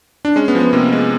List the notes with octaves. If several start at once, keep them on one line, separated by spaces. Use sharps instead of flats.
D4
G#3 C#4
B3
F3
B3
C3 A#3
G#3